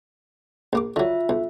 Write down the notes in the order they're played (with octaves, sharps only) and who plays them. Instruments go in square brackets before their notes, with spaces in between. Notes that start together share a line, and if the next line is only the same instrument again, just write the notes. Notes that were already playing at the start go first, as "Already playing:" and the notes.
[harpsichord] A#1 A#3 D6
[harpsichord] D3 F#3 [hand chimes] F4 E5
[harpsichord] B1